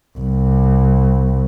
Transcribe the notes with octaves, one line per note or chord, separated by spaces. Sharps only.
C2